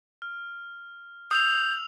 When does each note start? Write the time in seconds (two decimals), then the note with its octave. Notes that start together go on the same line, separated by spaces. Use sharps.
0.22 F6
1.31 D#6 E6 G6 F7